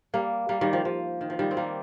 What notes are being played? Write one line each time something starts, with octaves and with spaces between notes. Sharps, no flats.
G3 A#3
G3 A#3
D#3 G3
F3
F3
D#3
F3
D#3 G3
C4
G3 A#3